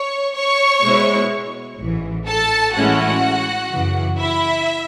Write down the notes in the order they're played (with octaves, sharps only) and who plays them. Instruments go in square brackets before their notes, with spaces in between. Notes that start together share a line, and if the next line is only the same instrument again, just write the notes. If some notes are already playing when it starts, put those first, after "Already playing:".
Already playing: [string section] C#5 C#6
C#5 C#6
B2 G#3 B3 E4
A1 G#2 E3
A4 A5
A2 E3 G#3 C#4 E4 F#4 F#5
F#2 C#3 E3
E4 E5